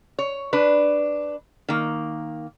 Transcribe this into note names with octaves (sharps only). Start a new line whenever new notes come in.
C#5
D4 B4
D#3 A#3